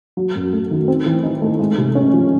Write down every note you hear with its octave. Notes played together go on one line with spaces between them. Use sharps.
F#3
F#2
A3
D#3
C4
E3
D#4
A3
G#3
C3
C#4
F3